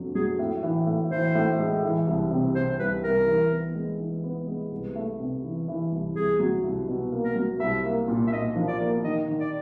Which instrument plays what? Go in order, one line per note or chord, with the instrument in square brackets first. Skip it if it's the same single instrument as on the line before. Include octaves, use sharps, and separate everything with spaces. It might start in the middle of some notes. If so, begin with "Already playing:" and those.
Already playing: [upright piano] F2 D3 F#3
[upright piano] F#3 [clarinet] G#4
[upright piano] A2
E3
A2
[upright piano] E3 [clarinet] C5
[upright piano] A2
G#3
E3
C2
C3
[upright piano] C3 [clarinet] C5
[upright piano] C2 [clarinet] B4
[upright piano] C2 [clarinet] A#4
[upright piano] E3
B3
G#3
E3
B3
G#3
C2
A3
C3
E3
E3
C2
[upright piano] C2 [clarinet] G#4
[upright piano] F#3
C2
B2
A#3
[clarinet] A#4
[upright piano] F#3
[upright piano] C2 [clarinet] E5
[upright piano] A#3
A#2
[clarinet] E5
[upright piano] A#2 [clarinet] D#5
[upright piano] F3
[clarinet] D5
[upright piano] A#3
[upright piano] D#3 [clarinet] D#5
[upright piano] D#3
[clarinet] D5